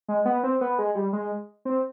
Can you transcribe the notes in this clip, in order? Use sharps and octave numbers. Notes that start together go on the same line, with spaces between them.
G#3
B3
C4
B3
G#3
G3
G#3
C4